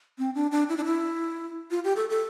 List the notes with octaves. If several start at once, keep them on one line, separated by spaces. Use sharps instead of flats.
C4
D4
D4
E4
D4
E4
F4
G4
A4
A4